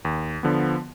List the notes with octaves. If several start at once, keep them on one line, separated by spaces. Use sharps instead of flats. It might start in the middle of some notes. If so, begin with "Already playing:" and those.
D#2
D3 F3 B3